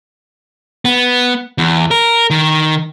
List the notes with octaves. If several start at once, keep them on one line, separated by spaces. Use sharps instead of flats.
B3
E2
A#4
D#3